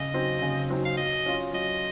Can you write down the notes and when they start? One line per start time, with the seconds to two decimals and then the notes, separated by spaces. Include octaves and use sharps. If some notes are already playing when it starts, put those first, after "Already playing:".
Already playing: C#3 D#5
0.14 F#3 C4 D#4
0.42 C#3
0.70 F#3 C4 D#4
0.85 F5
0.97 F#3 D#5
1.26 C#4 F4
1.53 F#3 D#5